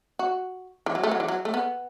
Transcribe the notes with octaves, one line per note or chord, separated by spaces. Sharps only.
F#4
E3
F#3
A3
F#3
E3
F#3
A3
B3